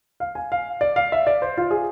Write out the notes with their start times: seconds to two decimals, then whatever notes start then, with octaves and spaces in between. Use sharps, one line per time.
0.20 F5
0.35 G#5
0.52 F5
0.81 D5
0.96 F5
1.12 E5
1.27 D5
1.42 C5
1.57 F4
1.71 G#4